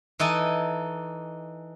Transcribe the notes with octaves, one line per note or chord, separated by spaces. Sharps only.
E3 D#4 A4 G#5